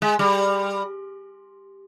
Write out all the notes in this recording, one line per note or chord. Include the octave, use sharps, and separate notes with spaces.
G#3
G3